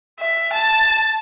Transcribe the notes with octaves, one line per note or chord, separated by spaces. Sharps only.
E5
A5